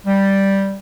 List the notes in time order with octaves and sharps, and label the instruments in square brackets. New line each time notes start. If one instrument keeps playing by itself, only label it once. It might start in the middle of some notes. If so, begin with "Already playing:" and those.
[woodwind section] G3